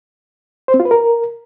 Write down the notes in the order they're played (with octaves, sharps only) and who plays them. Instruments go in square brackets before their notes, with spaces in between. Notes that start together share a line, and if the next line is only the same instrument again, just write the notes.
[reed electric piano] C5
C4
F4
B4
A#4